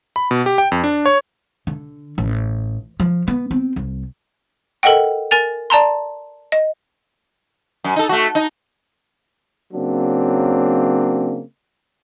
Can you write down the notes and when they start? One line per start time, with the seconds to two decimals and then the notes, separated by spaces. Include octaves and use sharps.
0.16 B5
0.31 B2
0.46 G4
0.58 G5
0.72 F2
0.84 D4
1.06 C#5
1.67 D3
2.18 A1
3.00 F3
3.28 B3
3.51 C4
3.76 C2
4.83 A4 A#4 D#5 F#5 G5
5.31 A#4 G#5 A6 F7
5.70 D5 A5 A#5 C6
6.52 D#5
7.84 F#2
7.96 D#4 A4
8.09 A3 F#4
8.35 D#4
9.73 C#3 F#3 A#3 C4 D4